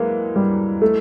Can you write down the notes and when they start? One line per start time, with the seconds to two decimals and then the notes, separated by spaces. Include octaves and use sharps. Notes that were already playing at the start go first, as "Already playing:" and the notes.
Already playing: E3 F#3 G#3 A#3
0.36 G3
0.82 A3